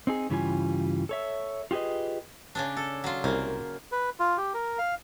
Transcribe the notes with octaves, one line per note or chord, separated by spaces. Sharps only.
C4 D#4 G#4
G2 C#3 E3 G3 F4 G#5
A4 C#5 E5
F4 G4 G#4 B4 D#5
C#3 C#4 D4
A4
F#3 F4
C2 C#3 A#3
B4
F4
G4
A#4
F5